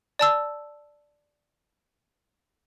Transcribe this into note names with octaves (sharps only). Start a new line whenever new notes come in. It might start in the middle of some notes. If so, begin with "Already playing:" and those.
D5 A5 E6